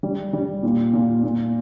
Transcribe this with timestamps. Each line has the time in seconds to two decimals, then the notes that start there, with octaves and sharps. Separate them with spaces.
0.03 G3
0.33 G3
0.63 A#2
0.93 A#2
1.23 A#2